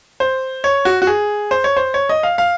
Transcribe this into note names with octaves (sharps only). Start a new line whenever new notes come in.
C5
C#5
F#4
F#4
G#4
C5
C#5
C5
C#5
D#5
F5
F5